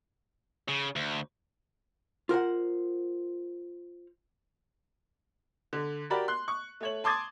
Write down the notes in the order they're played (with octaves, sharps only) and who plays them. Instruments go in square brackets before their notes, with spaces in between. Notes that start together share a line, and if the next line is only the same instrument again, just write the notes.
[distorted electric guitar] C#3
D2
[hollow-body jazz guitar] F4 A#4 C5 F#5
[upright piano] D3
F#4 G4 A#4 D5 B5
C6 F#6
C#6
A3 C#5 F#7
A5 C6 D6 D#6 G#6 A6